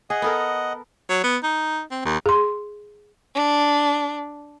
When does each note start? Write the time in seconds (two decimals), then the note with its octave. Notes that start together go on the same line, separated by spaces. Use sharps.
0.10 G#4 D#5 F#5
0.22 B3 A4 A#4
1.10 F#3
1.24 B3
1.43 D#4
1.91 C4
2.05 D#2
2.26 G#4 C6
3.35 D4